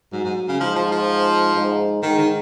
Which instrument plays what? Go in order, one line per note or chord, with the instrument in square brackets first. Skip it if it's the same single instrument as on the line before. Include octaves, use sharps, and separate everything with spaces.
[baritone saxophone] G#2 [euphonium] F#3
[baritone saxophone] G#2
C#3
[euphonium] G#2 [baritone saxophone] F3
[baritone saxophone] F3
F3
[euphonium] G#2
[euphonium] G#2 [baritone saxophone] D#3
[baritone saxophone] D#3